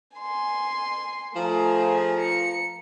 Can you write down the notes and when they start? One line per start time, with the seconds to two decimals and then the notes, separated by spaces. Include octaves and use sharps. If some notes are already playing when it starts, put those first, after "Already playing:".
0.17 G#5 C6
1.35 F3 A3 G#4 A#5
2.20 C#7